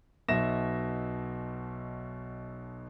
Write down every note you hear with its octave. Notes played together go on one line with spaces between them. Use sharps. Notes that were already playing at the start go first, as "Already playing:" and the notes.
B1 B2 E5 A#6 E7